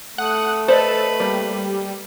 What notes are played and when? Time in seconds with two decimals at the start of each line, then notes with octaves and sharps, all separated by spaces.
0.18 A3 F#5 D#6
0.68 A4 B4 C5 D5 D#5
1.20 G3 A#3